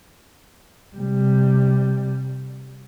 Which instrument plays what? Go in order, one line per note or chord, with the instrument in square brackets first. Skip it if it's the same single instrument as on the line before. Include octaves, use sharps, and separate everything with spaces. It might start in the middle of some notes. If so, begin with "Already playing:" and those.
[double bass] C3 G3